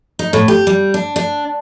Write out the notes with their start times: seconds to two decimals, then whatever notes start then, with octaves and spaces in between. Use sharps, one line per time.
0.19 D#4
0.33 A2
0.48 G4
0.67 G3
0.94 D4
1.16 D4